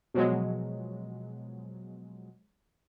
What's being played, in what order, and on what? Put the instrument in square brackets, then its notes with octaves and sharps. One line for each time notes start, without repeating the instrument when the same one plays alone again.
[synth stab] B2 F3 F#3 G#3